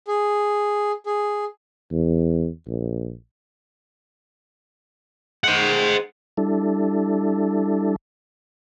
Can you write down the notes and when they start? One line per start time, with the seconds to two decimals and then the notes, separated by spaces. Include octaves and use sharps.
0.08 G#4
1.06 G#4
1.91 E2
2.67 A#1
5.44 D#3 G#3 C5 F#5
6.37 G3 D4 E4 A4